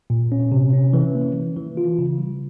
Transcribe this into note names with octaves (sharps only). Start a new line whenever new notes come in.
A#2
C#4
C3
C#4
E3
A#3
E3
E3
F4
C#3
G3